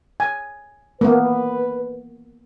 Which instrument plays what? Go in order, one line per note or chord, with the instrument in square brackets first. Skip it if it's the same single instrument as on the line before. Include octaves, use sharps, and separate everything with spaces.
[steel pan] G#5
[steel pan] A#3 B3 [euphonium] B4